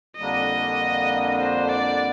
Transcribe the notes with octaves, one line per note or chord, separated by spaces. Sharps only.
F2 D3 G3 A#3 D4 D#5
C5
D5